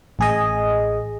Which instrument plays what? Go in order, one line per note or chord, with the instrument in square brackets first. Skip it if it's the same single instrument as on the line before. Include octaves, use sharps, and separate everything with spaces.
[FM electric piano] A1 G#4 D#5